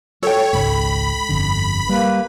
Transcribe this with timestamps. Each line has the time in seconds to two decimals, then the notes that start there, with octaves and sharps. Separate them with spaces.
0.23 A4 C#5 G5
0.53 G#1 C#2 G#2 B5
1.29 G1 F2 D3
1.89 G3 A#3 B4